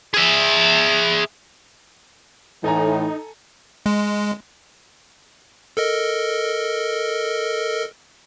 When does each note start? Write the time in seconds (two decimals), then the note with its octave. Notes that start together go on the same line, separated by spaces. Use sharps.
0.14 G#4 E5
2.64 A2 E3 D#4 A4 G#5 A#5
3.86 G#3
5.77 A4 A#4 D#5